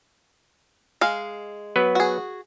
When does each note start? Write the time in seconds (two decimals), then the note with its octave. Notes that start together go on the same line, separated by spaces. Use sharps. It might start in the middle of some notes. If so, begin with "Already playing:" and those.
1.01 G#3 F5
1.76 F#3 B3 B4
1.95 F#4 G#4